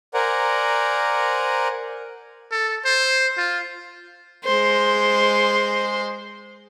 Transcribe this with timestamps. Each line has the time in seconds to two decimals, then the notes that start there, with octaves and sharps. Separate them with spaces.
0.14 A#4 C5 D5 F#5 G#5 A#5
2.52 A4
2.85 C5
3.38 F4
4.44 G#3 C5